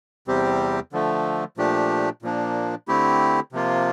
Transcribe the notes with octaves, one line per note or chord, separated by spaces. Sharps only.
E2 C3 G3 C4 G4
D3 F3 A3
A#2 F3 A3 D4 G4
A#2 F3 A#3 D4
D3 A3 C4 E4 G4
C3 F3 A#3 F4